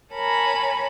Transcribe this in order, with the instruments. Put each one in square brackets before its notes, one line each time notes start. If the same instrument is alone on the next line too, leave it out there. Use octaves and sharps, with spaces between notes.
[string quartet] A#4 C#5 G#5 A5 B5